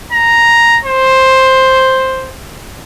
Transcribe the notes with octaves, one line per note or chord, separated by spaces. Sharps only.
A#5
C5